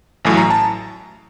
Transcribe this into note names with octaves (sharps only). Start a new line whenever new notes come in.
A1 A2 F#3 G#5
A#5
A5